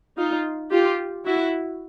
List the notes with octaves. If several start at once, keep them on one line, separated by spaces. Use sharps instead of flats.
D#4 F4
F4 G4
E4 F#4